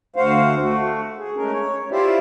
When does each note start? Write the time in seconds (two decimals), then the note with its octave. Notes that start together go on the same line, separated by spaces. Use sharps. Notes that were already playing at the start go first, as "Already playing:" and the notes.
0.16 D2 F#4 C5 F5
0.60 A3 F#4
1.18 G#4
1.37 G#3 A3 C#4 A#4
1.53 C#5
1.91 E4 F4 G4 C5 D5 E5